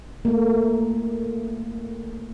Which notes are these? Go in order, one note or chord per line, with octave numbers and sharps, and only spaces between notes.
A3 A#3